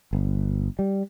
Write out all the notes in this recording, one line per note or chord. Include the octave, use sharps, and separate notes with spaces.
G1
G3